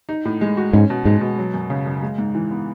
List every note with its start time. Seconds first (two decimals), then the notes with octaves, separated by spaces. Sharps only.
0.09 D#4
0.25 A2
0.41 G#3
0.57 F#4
0.73 G#2 C#4
0.90 B2
1.05 G#2 G#3
1.21 B2
1.38 F#3
1.54 F#2
1.70 C#3
1.86 F#2
2.03 G#3
2.18 G#2
2.35 E3
2.51 B3